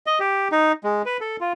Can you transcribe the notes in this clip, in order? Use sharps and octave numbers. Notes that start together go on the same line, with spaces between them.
D#5
G4
D#4
G#3
B4
A4
F4